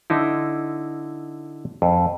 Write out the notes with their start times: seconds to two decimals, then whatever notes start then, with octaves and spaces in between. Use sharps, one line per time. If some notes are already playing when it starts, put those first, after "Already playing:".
0.10 D3 D#4 E4
1.82 F2